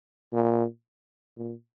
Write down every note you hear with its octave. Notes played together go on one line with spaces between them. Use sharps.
A#2
A#2